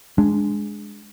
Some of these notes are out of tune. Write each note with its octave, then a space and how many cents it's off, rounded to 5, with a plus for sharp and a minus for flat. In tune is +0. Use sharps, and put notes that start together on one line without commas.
G#3 +0 D4 +0